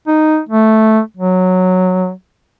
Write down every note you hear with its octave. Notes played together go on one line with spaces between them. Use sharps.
D#4
A3
F#3